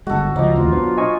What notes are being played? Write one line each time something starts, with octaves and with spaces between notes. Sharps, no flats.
G1 G#3 F#4 A4
C#2 F3 F#3 A#3 D#5
A1 D#2 F4
B2 F#3 D4 C5
D#5 G#5 C#6